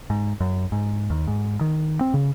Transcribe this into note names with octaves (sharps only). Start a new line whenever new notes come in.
G#2
F#2
G#2
D#2
G#2
D#3
C4
C#3